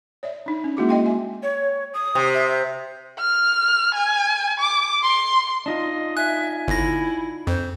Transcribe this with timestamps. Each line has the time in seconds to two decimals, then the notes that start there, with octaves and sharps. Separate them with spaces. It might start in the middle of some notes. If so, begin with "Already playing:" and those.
0.23 C#5 D5 E5
0.46 D4 D#4
0.64 C#4
0.77 G#3 A#3 E4 F#4 G#4 D6
0.89 D#5 G5 C6
1.06 E5 G#5
1.43 C#5
1.94 D#6
2.15 C3
2.34 E5
3.19 F6
3.94 G#5
4.60 D6
5.03 C6
5.66 D4 D#4 F4 D#5
6.17 E5 G#5 F#6
6.68 G1 E4 A#6
7.47 F2 C5